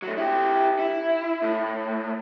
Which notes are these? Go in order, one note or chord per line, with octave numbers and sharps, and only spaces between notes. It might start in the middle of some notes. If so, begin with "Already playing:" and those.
F#3 A3
E4 G4
E4
A2